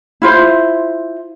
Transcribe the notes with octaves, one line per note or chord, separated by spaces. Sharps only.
E4 F4 C5